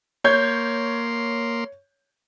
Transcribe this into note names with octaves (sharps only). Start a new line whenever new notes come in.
A#3 C#5 C6 G6